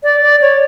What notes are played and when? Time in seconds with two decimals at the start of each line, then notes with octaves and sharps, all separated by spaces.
0.03 D5
0.23 D5
0.41 C#5